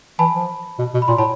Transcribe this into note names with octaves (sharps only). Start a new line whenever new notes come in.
E3 A5 B5
F3
B2
B2
B5
A#2 A#5 C6
A2 A5 B5